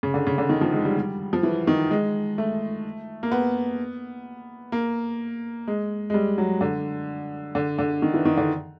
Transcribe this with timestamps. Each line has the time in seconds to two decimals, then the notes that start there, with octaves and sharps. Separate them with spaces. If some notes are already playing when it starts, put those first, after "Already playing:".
0.03 C#3
0.14 D3
0.27 C#3
0.38 D3
0.49 D#3
0.61 F3
0.73 G#3
0.85 G3
0.97 G3
1.33 F3
1.43 E3
1.67 D#3
1.91 G#3
2.38 A3
3.23 A#3
3.31 B3
4.72 A#3
5.67 G#3
6.10 G#3
6.14 G3
6.38 F#3
6.61 D3
7.55 D3
7.79 D3
8.02 D#3
8.14 E3
8.25 D#3
8.37 D3